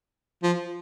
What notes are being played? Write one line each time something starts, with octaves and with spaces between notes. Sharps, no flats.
F3